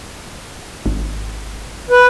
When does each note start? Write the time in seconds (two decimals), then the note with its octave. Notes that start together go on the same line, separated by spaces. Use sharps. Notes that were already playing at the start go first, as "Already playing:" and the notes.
0.86 G#1
1.90 B4